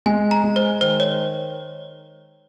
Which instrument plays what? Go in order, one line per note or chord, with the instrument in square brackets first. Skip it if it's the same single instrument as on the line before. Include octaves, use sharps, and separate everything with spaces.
[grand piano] G#3 [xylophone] G#5
[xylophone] A#5
[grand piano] G#3
[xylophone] C5
[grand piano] D#3 [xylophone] C5
[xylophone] C#5